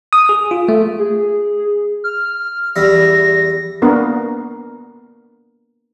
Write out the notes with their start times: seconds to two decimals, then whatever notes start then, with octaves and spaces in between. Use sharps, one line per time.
0.13 D#6
0.29 G#4
0.51 F4
0.69 A3
0.99 G#4
2.04 F6
2.76 E2 G3 E5 A#6
3.82 A#3 B3 D4 A#4